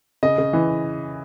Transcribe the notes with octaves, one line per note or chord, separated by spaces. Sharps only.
C#3 D#5
C#3
E3